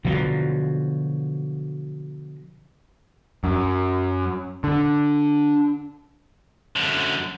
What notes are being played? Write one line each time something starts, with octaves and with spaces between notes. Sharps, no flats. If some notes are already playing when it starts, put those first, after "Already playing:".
B2 D3 F3 F#3
F#2
D3
F#2 D3